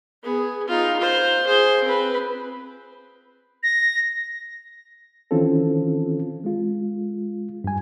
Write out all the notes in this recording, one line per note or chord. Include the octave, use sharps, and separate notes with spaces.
B3 G#4
D#4 F4
F4 C5
G#4 C5
C4 B4
A#6
D#3 E3 C4 C#4 F4 A4
G#3 F4
G2 G#5